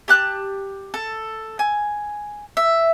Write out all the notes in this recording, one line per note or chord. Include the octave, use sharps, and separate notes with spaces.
G4 A5 F#6
A4
G#5
E5